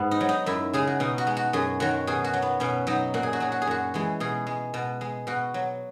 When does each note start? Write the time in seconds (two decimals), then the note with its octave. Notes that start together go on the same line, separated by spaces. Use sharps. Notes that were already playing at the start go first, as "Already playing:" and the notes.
Already playing: G#2 B3
0.11 D#4
0.21 F#3
0.29 D#4
0.46 F#2 E4
0.73 C#3 G#3 G#4
0.87 F#4
1.00 B2 D#4
1.18 F#4
1.27 G#3
1.37 F#4
1.53 F#2 G#4
1.80 D#3 F#3 F#4
2.07 B2 G#4
2.24 F#4
2.33 F#3
2.42 B3
2.60 B2 C#4
2.87 F#3 D#4
3.14 A#2 F#4
3.23 G#4
3.33 F#4
3.40 F#3 G#4
3.52 F#4
3.62 G#4
3.67 F#2 F#4
3.94 E3 G#3
4.20 B2 G#4
4.47 G#3
4.74 B2
5.01 G#3
5.27 B2 F#4
5.54 F#3